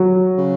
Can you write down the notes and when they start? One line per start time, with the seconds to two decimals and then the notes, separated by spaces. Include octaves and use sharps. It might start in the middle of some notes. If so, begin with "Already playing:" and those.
Already playing: F#3
0.38 C#3